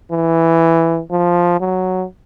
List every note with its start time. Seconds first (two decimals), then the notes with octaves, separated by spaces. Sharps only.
0.12 E3
1.11 F3
1.61 F#3